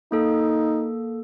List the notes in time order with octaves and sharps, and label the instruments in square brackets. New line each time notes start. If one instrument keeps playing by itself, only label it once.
[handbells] A#3 A4 [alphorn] D#4